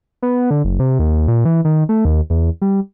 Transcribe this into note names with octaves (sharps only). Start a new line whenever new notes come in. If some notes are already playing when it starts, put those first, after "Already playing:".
B3
D3
F#1
C3
D#2
A#2
E3
D#3
A3
D#2
E2
G3